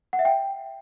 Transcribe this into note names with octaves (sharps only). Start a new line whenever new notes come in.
F#5
E5
G5